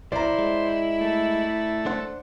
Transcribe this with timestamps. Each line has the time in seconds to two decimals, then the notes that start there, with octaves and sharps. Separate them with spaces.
0.12 B1 E4 C5 D5 A#5
0.39 G#3
1.01 A3
1.86 D4 C5 F#5